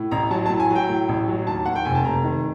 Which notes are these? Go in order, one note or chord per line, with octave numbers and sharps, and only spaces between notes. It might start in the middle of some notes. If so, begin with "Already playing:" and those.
Already playing: A2
A1 A#5
F#3 A5
A5
A2
G#5
F#3 G5
A2
A1
F#3
D#2 A5
D#2 F#5
G5
F1 G#5
A5
F1 A#5
D#3